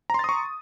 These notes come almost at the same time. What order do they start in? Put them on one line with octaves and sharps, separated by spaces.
A#5 C6 A6 D#6 C#6